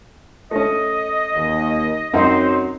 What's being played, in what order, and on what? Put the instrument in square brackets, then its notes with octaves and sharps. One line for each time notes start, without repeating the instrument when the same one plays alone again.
[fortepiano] A3 C#4 [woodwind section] D#5
[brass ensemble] D#2
[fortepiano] F#2 C4 D#4 [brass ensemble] F#3 [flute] C5